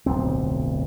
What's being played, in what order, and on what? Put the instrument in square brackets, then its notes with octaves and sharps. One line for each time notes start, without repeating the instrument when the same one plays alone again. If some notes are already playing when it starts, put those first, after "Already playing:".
[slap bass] D1 B1 F2 C4